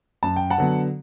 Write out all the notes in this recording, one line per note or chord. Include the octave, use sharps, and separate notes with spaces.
F#2 A5
G5
F#5 A5
D3 F#3 B3